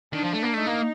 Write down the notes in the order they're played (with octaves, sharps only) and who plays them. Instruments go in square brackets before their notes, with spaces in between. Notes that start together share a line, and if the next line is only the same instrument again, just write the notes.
[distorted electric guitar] D#3 [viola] D4
[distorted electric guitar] F3
A3
A#3
[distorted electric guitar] A3 [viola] D#4
[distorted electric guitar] A#3